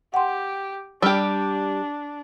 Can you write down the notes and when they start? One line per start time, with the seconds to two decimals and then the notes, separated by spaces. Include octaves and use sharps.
0.14 G4 F#5 G5 C6
1.02 G3 D4 G4 E6 F6